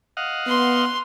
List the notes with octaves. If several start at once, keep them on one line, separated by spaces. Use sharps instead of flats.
D#5 F5 F#5
B3 C6